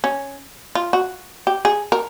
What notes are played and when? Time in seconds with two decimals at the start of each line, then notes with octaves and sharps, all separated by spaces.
0.04 C#4
0.75 F4
0.93 F#4
1.47 G4
1.65 G#4
1.92 A#4